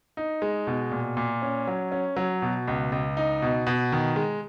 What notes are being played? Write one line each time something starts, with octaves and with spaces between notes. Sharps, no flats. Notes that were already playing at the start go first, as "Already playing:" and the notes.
D#4
G#3
B2
A#2
A#2
C#4
F#3
C#4
F#3
B2
C#2
C#2
D#4
B2
B2
D#3
G#3